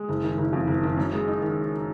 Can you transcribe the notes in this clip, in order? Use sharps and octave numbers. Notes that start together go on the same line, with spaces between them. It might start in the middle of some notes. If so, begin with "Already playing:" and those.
Already playing: G#3
F#1
D#3
F#1
F2
F#1
D#3
F#2
G#3
D#4
D#3